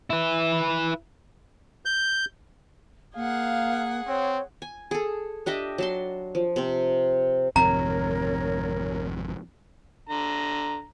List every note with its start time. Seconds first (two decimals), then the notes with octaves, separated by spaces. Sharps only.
0.10 E4 B4
1.85 G6
3.16 A#3 G#4 F5 F#5
4.07 C4 C#5
4.62 G#5
4.91 G#4 A4
5.46 D4 G4 D#5 E5
5.78 F#3 A5 C6
6.35 F3
6.56 C3 C4
7.56 G#1 F2 C3 A#4 C#5 A#5
10.09 D3 A#5